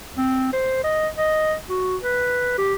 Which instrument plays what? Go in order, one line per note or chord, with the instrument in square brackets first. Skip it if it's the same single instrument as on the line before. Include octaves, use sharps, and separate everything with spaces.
[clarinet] C4
C5
D#5
D#5
F#4
B4
G4